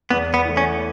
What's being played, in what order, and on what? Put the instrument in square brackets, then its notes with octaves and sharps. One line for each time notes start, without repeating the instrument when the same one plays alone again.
[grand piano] E2 [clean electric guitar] B3
[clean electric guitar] B3
[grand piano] E3 A3
[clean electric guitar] C#4